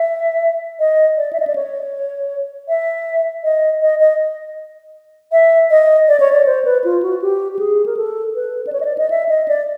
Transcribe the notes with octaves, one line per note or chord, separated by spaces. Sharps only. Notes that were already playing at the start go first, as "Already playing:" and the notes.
Already playing: E5
D#5
D5
E5
D#5
D5
C#5
E5
D#5
D#5
D#5
E5
D#5
D5
C#5
D5
C5
B4
F4
F#4
G4
G4
G#4
A#4
A4
B4
D5
C#5
D#5
D5
D#5
E5
D#5
D5